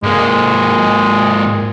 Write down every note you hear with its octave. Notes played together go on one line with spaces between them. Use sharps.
G#2 G#3 A#3